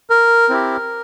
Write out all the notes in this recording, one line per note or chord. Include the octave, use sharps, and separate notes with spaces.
A#4
C4 E4 G4